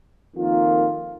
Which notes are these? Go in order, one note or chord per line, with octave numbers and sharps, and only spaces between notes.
F2 D#3 A#3 F4